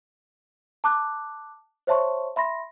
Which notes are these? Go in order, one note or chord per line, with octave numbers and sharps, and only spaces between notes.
A5 D6 F#6
C5 C#5 E5 A5 C6 C#6
E5 B5 C6 A#6